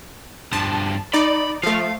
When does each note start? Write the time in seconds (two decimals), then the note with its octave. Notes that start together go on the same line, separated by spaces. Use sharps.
0.53 G2 F3 A5
1.13 D#4 D5 B5
1.63 F3 A3 F5